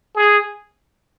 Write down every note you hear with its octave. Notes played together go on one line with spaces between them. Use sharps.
G#4